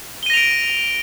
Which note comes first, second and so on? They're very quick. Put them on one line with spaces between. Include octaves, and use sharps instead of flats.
G7 D#7 A#6 F7 D7